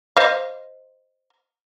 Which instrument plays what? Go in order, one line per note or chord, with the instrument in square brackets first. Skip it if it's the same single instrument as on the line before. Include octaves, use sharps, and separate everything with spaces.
[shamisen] C5 D#5 F5